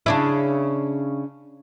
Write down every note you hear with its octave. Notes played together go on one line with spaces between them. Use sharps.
C#3 D4 E4